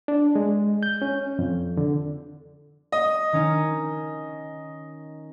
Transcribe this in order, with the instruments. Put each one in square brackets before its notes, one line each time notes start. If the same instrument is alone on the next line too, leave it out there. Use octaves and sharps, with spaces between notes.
[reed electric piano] D4
G#3
G6
C#4
F2
D3
[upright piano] D#5
[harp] D#3 C#4 D#4